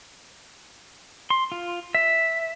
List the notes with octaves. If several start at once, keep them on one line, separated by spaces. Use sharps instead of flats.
C6
F4
E5